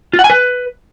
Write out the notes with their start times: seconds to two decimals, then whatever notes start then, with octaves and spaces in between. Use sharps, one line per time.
0.13 F4
0.19 F#5
0.24 G#5
0.30 B4